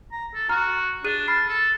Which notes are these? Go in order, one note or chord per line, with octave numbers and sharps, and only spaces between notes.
A#5
A4
F#4 A#5 F6
D4 G#4 F#6 D#7
A5 B5 F6 C7
A4